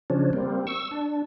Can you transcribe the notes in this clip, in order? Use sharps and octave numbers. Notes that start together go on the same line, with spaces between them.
C#3 F3 C#4 D4
G3 A#3 C4
C#6 E6
D4